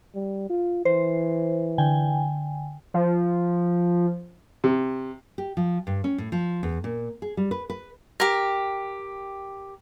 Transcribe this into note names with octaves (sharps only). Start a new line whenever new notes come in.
G3
F4
E3 C5
D3 G5 G#5
F3
C3
G4
F3
G2
C#4
A2
F3
E2
A#2
G#4
G3
B4
B4
G4 A#4